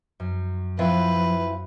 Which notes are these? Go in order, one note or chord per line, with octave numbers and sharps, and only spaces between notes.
F#2
E3 F3 C4 F4 B4